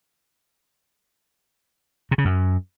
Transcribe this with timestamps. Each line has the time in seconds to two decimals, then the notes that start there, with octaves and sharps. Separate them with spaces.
2.11 C3
2.18 C#3
2.25 F#2